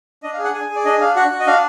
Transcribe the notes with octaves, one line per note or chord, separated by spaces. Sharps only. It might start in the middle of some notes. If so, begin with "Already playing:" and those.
D4 D#5
F5
G#4
F#5
G#4 G#5
G#4
D5
D4 D#5
D4 F5
F#4 F#5
F#4
D#5
D4 F5